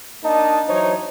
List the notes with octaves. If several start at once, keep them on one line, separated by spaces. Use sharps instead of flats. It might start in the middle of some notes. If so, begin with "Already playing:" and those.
A#3 D4 D#4 D#5 A5
E3 F#3 D#4 C5 C#5